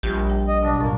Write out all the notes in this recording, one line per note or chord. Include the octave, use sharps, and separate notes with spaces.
A#1 G3 F4 G4
A#4
G5
D#5
B2 F#3 D4
F2 A2 A#3 A6